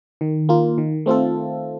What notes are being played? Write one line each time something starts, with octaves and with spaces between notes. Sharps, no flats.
D#3
A#3 F4
D#3
A3 C4 F4 A4